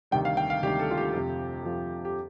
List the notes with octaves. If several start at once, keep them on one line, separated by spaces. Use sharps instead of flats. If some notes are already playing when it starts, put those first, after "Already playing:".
D2 C3 D#3 G3 G5
F5
G5
F5
D2 C3 D#3 G3 G4
A4
F4
G4
F2 C3 F3
F2 C3 F3
G4